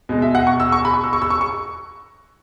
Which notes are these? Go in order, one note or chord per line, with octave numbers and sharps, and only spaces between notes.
B2 G#3
E5
F#5
C#6
E6
C#6
B5
C#6
E6
C#6
E6
C#6
C#6